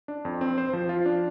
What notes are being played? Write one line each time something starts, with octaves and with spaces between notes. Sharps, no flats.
D4
F2
C4
C5
F3
F4
D4